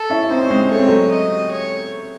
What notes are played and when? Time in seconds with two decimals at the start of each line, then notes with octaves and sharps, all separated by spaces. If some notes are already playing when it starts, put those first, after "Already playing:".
Already playing: A4
0.10 C#4 E4
0.30 C4 D#4 C5
0.42 C#4
0.50 G#3 C4
0.71 A3 C#5
0.79 C4
0.88 F#3 A3
1.11 D#5
1.52 C#5